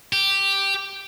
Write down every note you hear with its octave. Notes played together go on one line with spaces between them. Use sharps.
G4